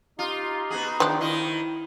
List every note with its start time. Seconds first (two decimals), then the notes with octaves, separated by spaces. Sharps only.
0.19 D#4 F4 G4
0.70 B3 F#4 G#4
1.00 D#3 F3 D4 G5
1.21 D#3 D#4 E4